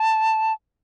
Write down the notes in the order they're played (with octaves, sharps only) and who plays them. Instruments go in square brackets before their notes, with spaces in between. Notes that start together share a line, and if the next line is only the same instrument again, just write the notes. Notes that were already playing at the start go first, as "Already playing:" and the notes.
Already playing: [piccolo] A5